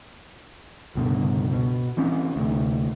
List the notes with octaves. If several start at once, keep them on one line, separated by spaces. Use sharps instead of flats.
C#2 G2 B2 D3
B2
E3 C4 C#4
D2 C3